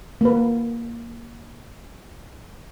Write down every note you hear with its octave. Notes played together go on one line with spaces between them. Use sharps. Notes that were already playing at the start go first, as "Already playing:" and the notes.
A#3 B4